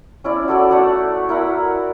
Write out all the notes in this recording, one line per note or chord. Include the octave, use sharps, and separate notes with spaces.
C#4 E4 D5
F#4 A4 D5
A3 E4 D5 F#5
E4 A#4 E5 F#5